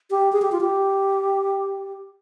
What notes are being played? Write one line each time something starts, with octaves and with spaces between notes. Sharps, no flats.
G4
G#4
G4
F4
G4